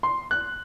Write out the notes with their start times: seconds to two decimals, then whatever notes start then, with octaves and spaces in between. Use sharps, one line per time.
0.03 C6
0.31 F#6